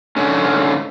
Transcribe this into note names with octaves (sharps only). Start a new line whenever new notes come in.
G#2 D3 C#4